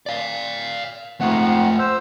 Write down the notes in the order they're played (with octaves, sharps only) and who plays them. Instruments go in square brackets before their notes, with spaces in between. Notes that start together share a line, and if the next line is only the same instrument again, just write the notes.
[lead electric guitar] D5 F5
[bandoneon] F2 G#2 F#5 [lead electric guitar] A3 F4
[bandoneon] C5 E6